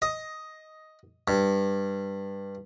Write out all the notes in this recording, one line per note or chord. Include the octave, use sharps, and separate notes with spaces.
D#5
G2